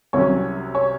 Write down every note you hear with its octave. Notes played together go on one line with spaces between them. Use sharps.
C2 C3 F#3 C#4 C#5
C#5